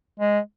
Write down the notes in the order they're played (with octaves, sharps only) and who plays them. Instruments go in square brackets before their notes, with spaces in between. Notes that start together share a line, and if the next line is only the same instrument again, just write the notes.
[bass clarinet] G#3